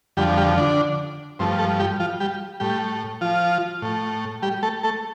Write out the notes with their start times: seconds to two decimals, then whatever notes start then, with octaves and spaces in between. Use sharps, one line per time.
0.17 F2 D3 F3 G3 G4
0.37 G3 G4
0.57 D3 D4
1.39 G2 F3 A3 C4
1.59 A3 A4
1.79 G3 G4
2.00 F3 F4
2.20 G3 G4
2.60 A2 G3 A3 G4
3.21 F3 F4
3.82 A2 A3
4.42 G3 G4
4.63 A3 A4
4.83 A3 A4